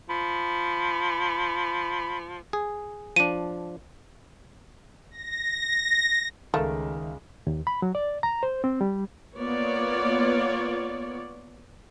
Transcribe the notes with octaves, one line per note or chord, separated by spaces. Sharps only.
F3 B5
G#4
F3 D4 D#7
A#6
C#2 D#3 A3 A#4 E5 F5
D#2
B5
F#3
D5
A#5
C5
C4
G3
A#3 B3 F4 C#5 D5